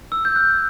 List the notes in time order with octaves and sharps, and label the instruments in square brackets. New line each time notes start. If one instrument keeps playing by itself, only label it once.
[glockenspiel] E6
G6
F#6